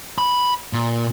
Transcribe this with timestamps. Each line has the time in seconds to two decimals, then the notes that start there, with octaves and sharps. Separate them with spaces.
0.18 B5
0.73 A#2